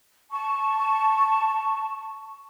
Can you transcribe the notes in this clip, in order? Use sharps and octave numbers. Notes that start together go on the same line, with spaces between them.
A5 C#6